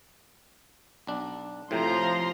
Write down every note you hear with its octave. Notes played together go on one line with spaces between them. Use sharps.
B1 D4
A2 C3 F3 A#5 C6